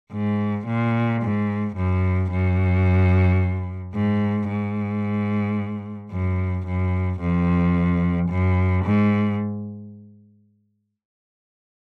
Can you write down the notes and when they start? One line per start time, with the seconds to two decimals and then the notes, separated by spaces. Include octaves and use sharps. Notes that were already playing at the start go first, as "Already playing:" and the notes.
0.12 G#2
0.67 A#2
1.22 G#2
1.76 F#2
2.31 F#2
3.95 G#2
4.49 G#2
6.12 F#2
6.67 F#2
7.21 F2
8.30 F#2
8.85 G#2